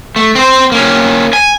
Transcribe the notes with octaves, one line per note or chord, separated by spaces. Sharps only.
A3
C4 C5
A#3 C#4
G#5